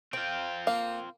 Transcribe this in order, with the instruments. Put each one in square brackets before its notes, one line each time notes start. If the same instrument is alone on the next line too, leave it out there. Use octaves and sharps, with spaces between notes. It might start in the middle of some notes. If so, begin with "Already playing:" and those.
[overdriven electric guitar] C4 F4 [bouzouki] G5
[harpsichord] A#3 [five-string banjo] F5